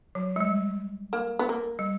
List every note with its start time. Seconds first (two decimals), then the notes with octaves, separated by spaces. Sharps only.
0.15 F#3
0.36 G#3
0.40 G3
1.13 A#3
1.39 B3
1.49 A#3
1.79 G3